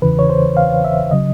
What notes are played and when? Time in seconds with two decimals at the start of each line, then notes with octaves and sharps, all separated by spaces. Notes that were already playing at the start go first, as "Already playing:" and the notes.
0.02 E2 C#3 E3 B4
0.19 C#5
0.30 C5
0.57 F5
0.85 E5
1.11 C#3 F#3 D#5